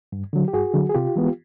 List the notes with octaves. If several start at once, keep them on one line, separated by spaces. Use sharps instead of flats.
G2
D3 F#3
G4
G2 F#4 G#4
D3 F#3
G#4
C3 F4 G4
E3 G#3 B3